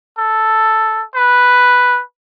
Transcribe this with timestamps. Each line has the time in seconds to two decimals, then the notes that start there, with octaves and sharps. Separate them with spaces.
0.18 A4
1.15 B4